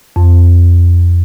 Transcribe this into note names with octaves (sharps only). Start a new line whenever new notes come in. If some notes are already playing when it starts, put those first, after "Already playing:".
F2